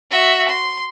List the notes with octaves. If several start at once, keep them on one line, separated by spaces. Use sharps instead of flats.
F#4 E5
C6